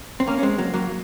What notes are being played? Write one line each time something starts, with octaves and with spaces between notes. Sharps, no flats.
C4
A#3 C#4
C#4
G#3 C4
F#3 A#3
F#3 A#3